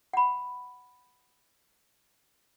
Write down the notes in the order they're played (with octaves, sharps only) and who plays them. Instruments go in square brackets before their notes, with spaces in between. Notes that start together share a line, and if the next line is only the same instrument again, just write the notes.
[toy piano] F#5 B5